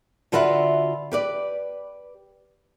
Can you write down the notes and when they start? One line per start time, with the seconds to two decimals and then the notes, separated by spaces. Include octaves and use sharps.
0.32 D3 F4 F#4 B4 D5 E5
1.12 G4 B4 D5